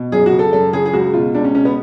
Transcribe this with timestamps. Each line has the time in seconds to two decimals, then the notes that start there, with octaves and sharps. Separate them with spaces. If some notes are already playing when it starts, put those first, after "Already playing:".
Already playing: B2
0.12 F#2 G#4
0.26 F#4
0.32 C#3
0.39 A4
0.52 F#2 A4
0.73 C#3 G#4
0.86 G#4
0.93 C#2 F#4
1.14 B2 F4
1.34 C#2 D4
1.44 C#4
1.55 B2 C#4
1.65 B3